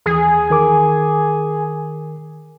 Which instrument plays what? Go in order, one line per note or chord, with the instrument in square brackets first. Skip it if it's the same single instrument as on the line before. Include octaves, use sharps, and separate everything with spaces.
[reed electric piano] D#2 E3 [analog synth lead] G#4
[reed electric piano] D#3 A#4 D6